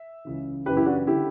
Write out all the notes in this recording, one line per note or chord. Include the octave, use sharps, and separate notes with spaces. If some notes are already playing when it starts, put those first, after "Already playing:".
Already playing: E5
C#2 C#3 E3
F#2 C#3 E3 G4 B4
E4 G4
D4 F#4
D3 E4 G4